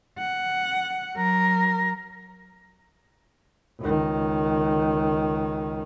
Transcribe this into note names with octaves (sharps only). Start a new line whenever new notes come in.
F#5
F#3 A#4
C#2 D#3